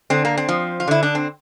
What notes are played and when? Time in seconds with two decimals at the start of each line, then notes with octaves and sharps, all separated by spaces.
0.10 D3 C4
0.25 A#3
0.38 C4
0.49 F3
0.80 F4
0.88 D3 E4
1.03 D4
1.15 C4